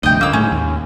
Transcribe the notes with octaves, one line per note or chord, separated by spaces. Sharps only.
F1 D2 G2 D#5 G5
C#2 D3 A#3 E6
A2 G3 G#3 C#4
D#2